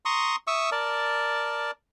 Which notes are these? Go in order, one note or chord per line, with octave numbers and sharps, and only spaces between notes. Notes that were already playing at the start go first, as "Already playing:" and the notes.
A#5 C6 C#6 D#6
E5 C#6 D#6 E6
A#4 D5 A5